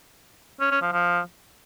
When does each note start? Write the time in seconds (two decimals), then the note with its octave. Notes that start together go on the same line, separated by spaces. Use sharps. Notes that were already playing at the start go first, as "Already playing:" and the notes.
0.60 C#4
0.71 C#4
0.82 F3
0.93 F3